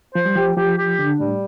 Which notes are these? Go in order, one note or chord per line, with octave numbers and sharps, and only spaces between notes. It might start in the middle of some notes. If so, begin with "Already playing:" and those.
F3 C5
G3
F3 G4
F3 G4
G4
D3 D4
A2 G3